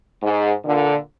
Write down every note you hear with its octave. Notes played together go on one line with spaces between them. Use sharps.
G#2
A#2 D3